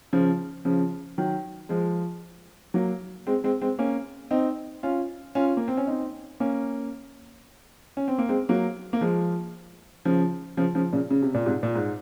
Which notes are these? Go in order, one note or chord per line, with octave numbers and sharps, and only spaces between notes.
C#3 F3
C#3 F3
D#3 F#3
F3 G#3
F#3 A#3
G#3 C4
G#3 C4
G#3 C4
A#3 C#4
C4 D#4
C#4 F4
C#4 F4
A#3
C4
C#4
C4 D#4
A#3 C#4
C#4
C4
A#3
G#3 C4
F#3 A#3
A#3
F3 G#3
C#3 F3
C#3 F3
C#3 F3
A#2 C#3
C#3
C3
A#2
G#2 C3
A#2
G#2